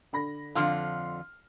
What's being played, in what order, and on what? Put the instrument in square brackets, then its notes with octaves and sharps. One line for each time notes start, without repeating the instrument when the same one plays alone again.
[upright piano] D3 B5 A#6
[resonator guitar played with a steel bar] F2 D3 F4 [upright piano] C6 F6